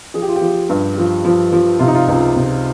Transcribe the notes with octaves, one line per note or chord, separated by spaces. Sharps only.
F3 G#4
G4
F4
G4
F3
G2
F3
F3
F3
C3 F4
D#4
F4
C#2
C3